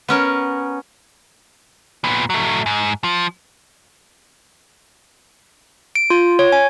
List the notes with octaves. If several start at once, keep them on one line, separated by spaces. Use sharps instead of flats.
B3 C#4 A#4
A#2 B3
F#3 A3
G#2
F3
D7
F4
C#5
G#5